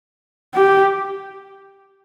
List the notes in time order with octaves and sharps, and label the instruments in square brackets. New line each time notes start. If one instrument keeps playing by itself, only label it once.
[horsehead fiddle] G4